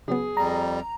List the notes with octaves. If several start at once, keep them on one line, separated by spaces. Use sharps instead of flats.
C#3 F#3 B3 G#4
F2 G3 A#5